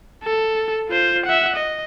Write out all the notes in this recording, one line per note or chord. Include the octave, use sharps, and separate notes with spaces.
A4
F4 C5
E5 F#5
D#5